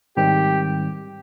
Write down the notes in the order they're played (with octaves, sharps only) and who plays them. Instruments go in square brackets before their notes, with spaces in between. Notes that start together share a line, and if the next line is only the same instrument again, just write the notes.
[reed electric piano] G#2 D#3 G3 C4 [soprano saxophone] G4